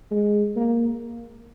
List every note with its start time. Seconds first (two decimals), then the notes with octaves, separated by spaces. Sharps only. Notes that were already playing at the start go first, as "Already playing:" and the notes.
0.11 G#3
0.56 A#3